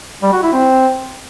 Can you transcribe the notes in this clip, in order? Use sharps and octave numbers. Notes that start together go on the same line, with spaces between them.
G3
F#4
E4
C4